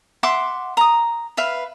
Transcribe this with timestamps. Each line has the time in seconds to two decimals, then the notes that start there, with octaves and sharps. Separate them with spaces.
0.23 E5 F#5 C6 D6
0.77 A#5 D#6
1.37 B4 E5 F5